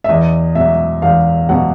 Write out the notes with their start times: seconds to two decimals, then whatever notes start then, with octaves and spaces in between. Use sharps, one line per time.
0.04 E5
0.09 E2 D#5
0.55 B2 F#3 E5
1.02 E2 F5
1.49 B2 F#3 F#5